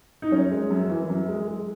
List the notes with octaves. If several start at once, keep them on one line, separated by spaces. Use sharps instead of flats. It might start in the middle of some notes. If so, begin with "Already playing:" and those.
D#4
F#2 C#4
G#3
F#2
E3
F#2
G#3
G#3